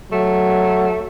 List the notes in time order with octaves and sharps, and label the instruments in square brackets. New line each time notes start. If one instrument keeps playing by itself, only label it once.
[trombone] F#3 [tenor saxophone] A3